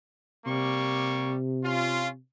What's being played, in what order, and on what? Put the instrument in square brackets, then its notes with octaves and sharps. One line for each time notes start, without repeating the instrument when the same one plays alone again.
[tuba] C3 [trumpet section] G3 A#3 C#6
[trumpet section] C#4 F4